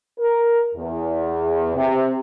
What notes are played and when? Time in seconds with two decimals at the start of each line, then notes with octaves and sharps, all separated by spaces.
0.18 A#4
0.75 E2
1.76 C3